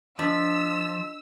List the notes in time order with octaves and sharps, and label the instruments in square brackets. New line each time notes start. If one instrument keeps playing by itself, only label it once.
[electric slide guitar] F3 [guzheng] D4 [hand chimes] D#5 B6 [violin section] E6